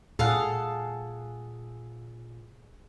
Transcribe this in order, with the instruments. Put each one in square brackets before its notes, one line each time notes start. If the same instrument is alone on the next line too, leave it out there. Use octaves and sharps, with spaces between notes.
[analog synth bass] A#2 [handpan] G#4 [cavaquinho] A4 F5 F#5